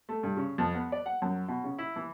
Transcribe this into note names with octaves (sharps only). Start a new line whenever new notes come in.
A3
G2
C#3
F2
B3
D5
F#5
F#2
B2
C#3
E4
E3